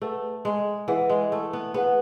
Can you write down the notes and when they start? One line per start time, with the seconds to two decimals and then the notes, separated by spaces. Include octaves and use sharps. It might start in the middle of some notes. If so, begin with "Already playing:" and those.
0.02 A3 G#4 B4 F#5
0.45 G#3
0.88 E3 G#4 B4 F#5
1.10 G#3
1.32 A3
1.53 B3
1.74 B3 G#4 B4 F#5